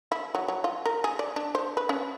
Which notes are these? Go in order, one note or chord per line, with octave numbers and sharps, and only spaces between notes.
E4
F#3
F#3
F4
A#4
G#4
D5
D4
C5
B4
C#4